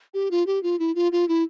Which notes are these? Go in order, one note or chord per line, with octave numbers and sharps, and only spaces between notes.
G4
F4
G4
F4
E4
F4
F4
E4